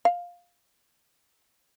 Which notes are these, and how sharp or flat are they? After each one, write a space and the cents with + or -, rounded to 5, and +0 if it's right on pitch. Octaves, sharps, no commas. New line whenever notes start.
F5 +10